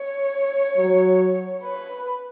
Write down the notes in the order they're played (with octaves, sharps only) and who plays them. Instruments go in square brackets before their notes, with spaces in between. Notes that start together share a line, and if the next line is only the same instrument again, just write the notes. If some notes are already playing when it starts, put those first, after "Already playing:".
Already playing: [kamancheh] C#5
[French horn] F#3
[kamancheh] B4